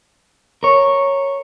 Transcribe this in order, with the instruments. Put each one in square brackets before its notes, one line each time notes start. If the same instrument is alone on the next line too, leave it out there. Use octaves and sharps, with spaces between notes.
[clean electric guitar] A#4 C#5